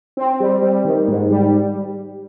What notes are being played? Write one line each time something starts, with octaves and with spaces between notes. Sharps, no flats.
C4
G3
G3
D#3
G#2
G3